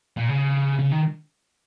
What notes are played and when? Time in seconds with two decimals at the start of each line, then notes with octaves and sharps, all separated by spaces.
0.17 A#2
0.29 C#3
0.79 C#3
0.92 D#3